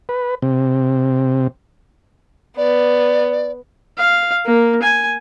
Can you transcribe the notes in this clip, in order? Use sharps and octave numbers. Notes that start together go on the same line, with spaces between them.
B4
C3
B3 D5
F5
A#3
G#5